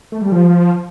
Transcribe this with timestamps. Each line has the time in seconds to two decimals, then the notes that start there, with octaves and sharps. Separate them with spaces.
0.12 A3
0.22 G3
0.32 F3